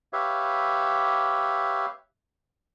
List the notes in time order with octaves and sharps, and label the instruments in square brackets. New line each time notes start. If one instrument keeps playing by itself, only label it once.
[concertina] G4 B4 C#5 E5 F5